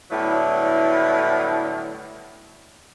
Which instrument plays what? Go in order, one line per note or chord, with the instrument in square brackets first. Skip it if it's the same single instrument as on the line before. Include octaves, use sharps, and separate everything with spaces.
[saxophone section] A2 D3 F#3 G3 B3 E4